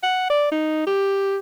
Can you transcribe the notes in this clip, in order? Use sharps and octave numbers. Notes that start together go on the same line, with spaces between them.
F#5
D5
D#4
G4